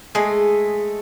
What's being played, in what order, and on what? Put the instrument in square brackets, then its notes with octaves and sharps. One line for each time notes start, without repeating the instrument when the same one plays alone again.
[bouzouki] G#3 A3 G#4 D#5